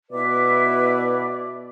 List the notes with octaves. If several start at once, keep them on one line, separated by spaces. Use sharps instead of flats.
B2 E4 B4 D5 E5